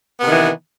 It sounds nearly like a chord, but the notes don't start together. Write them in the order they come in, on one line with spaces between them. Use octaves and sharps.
B3 C3 D#3 E3